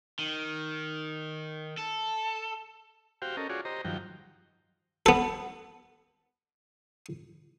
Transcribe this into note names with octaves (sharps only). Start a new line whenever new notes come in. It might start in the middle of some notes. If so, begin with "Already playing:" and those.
D#3
A4
F#4 G4 C5 F5 G5
C#4 A4 A#4 D#5
F4 F#4 G#4 C#5 D5
G4 C5 D#5 A#5
G2 D#3 F3 F#3 G5
B3 A4